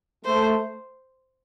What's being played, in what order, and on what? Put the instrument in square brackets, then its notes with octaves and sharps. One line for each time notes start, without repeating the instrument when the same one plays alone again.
[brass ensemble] A3 [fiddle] C5